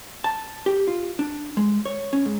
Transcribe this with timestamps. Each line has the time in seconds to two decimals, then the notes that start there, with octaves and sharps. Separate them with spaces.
0.24 A5
0.66 G4
0.88 F4
1.19 D4
1.57 G#3
1.85 C#5
2.13 C#4
2.25 G#2